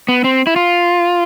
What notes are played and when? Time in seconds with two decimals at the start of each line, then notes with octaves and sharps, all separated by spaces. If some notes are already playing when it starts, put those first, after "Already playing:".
0.08 B3
0.24 C4
0.47 E4
0.56 F4